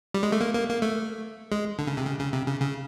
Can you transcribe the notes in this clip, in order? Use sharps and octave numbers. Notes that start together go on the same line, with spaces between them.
G3
G#3
A3
A#3
A#3
A#3
A3
G#3
D3
C#3
C3
C#3
C#3
C3
C#3
C#3